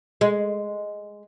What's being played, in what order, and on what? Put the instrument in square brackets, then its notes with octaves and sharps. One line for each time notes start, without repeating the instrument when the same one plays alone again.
[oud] G#3